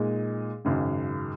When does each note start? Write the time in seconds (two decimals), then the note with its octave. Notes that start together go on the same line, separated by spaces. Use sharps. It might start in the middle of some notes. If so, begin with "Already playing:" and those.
Already playing: A#2 G#3 D#4 G#4
0.65 G#1 F#2 C#3